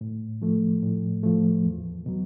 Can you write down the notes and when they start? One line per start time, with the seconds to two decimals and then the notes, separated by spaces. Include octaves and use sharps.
0.01 A2
0.42 F3 A3
0.82 A2
1.23 F3 A3
1.65 E2
2.06 B2 F#3